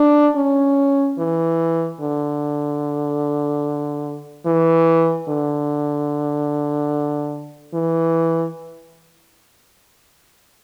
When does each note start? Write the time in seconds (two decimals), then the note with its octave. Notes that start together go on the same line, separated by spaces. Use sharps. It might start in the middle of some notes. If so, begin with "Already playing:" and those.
Already playing: D4
0.36 C#4
1.18 E3
2.00 D3
4.46 E3
5.28 D3
7.74 E3